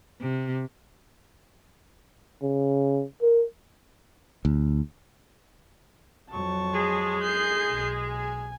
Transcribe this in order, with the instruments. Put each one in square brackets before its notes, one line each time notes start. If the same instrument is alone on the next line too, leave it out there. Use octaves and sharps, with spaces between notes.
[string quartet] C3
[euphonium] C#3
A#4
[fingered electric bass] D2
[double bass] F2 F#3 [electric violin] A5 C#6
[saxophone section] G#3 G#4
[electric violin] G6 C7
[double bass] B1
[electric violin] G#5